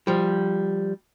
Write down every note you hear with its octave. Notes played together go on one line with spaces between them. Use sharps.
F3 G3